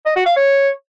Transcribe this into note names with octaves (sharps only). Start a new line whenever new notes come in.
D#5
F#4
F5
C#5